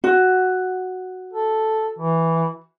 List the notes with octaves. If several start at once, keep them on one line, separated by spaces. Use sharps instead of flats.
F#4
A4
E3